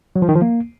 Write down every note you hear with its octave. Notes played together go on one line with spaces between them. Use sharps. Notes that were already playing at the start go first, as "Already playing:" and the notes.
F#3
F3
D#3
F3
A#3